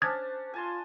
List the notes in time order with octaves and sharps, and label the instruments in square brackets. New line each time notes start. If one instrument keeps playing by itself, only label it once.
[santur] C#4 D4 A5 [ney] C5 [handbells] D#6 G#6 A6
[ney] F4 [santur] G#5 A5 C6